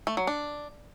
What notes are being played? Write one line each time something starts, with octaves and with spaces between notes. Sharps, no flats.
A3
F#3
D4